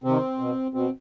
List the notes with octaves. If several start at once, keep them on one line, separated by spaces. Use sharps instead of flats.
C3 D#3 C4
B2
B2 C4